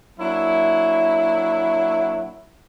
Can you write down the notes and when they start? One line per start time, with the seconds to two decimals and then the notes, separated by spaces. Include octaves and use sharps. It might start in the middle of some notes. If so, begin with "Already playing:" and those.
0.19 F#3 A#3 D4 E4